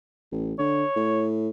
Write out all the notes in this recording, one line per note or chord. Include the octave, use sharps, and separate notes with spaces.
A1
D3 C#5
A2